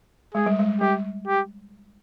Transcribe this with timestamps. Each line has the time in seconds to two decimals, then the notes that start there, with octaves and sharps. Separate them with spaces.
0.35 G#3 G#4
0.46 G3
0.59 G#3
0.81 G3 G4
1.28 G4